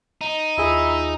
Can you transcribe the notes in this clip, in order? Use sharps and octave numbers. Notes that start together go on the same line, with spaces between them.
D#4
D#2 E4 F4 G#4